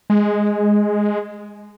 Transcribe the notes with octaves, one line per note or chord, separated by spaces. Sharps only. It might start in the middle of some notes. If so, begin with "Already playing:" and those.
G#3